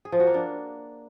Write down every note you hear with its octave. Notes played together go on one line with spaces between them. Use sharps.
G#4
F3
F#4
A#3
D4